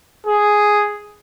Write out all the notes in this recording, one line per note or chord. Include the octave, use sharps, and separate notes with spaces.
G#4